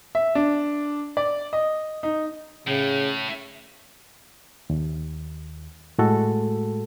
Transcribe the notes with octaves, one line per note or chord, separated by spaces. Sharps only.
E5
D4
D5
D#5
D#4
A2 C#3
D#2
A2 G#3 F#4 A4